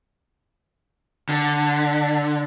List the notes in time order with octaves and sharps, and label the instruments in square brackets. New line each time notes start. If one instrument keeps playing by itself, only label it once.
[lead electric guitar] D3